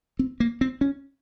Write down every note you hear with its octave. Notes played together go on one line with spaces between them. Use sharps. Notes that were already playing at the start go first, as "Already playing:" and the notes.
C4
A#3
C4
C#4